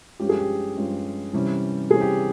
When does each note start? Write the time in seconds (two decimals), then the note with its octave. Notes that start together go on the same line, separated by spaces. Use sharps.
0.20 G2 F3 G#3 C#4 G4
0.29 G#4
0.39 G4
0.77 G2 F3 G#3 C#4
1.33 C3 E3 G3 C#4
1.91 C3 E3 G3 C#4 G#4
2.01 G4